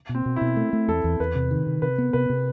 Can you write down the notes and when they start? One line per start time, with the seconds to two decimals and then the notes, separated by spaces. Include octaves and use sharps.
0.09 B2
0.15 C4
0.26 B2
0.36 E4
0.41 B2
0.56 A3
0.73 A3
0.88 E2 A4
1.04 E2
1.20 E2 B4
1.35 C3
1.51 D#3
1.67 C3
1.82 C3 B4
1.98 B3
2.13 C3 B4
2.30 C3